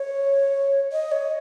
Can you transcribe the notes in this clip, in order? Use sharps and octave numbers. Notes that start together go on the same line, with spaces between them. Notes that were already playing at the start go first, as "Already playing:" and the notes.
Already playing: C#5
D#5
C#5